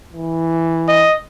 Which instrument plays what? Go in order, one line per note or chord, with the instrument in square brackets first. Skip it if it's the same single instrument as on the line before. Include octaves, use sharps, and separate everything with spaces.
[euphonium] E3
[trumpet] D#5